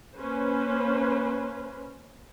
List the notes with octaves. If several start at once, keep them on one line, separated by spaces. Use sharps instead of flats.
A#3 C#4 B4 C5